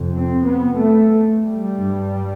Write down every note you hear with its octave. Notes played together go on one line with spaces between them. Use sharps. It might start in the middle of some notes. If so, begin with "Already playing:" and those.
Already playing: F2 C3
C4
B3
A3
G3
G2